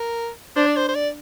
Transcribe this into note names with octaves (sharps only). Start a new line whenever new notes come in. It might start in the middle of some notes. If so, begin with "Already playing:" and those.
Already playing: A#4
D4 C5
D5
C5
C5
D5